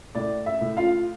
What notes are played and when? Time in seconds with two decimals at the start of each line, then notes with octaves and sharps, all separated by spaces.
0.15 A2 D5
0.46 E5
0.61 A2
0.77 F4 F5